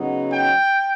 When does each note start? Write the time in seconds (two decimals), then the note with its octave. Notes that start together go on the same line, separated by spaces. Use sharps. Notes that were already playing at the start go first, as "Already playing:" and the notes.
Already playing: C#3 F#3 B3 D#4
0.32 G5